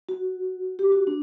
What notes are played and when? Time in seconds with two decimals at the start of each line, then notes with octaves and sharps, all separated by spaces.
0.09 F#4
0.79 G4
0.92 F#4
1.07 D4